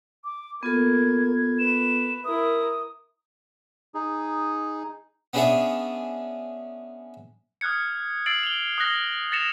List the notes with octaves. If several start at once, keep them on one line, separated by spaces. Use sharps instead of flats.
D6
A#3 B3 F4 A4 G#6
B4 E7
E4 A#4 D#6
D#4 G#4
B3 C#4 D4 G#4 C#5 E5
D#6 F6 F#6 G#6 C#7
E6 A6 C7 D7 F#7
F7 G7
D#6 F6 F#6 A#6 G7
A6 A#6 C#7 E7 F7